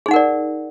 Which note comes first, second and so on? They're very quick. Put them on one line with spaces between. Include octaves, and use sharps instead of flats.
G#4 D#4 F#5 A#4 D5